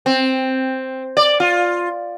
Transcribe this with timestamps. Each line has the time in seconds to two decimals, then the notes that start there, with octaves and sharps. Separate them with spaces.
0.06 C4
1.17 D5
1.40 F4